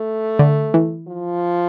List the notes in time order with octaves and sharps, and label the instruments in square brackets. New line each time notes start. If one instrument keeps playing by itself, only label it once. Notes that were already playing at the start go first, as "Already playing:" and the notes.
Already playing: [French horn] A3
[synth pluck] D3
E3
[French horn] F3